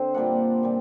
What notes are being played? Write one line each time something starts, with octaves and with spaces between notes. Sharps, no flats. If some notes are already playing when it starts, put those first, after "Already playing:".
Already playing: D3 C4 C5
A#2 G3 A#3 D4 F#5
A#2 G3